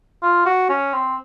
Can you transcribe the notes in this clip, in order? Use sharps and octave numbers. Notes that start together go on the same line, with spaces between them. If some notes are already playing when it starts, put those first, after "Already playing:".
F4
F#4
C#4
C4